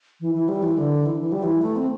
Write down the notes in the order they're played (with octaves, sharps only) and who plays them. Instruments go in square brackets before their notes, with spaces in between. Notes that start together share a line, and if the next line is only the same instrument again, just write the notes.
[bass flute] E3
E3
G3
E3
D3
E3
E3
G3
E3
A3
C4